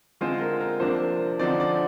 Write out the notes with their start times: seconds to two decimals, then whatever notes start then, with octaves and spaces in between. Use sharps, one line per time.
0.21 D3 G#3 C4 F4 C5
0.41 A#4
0.61 A#4
0.80 C3 F3 A#3 D4 C5
1.39 D3 F3 C4 D#4 D5
1.60 D5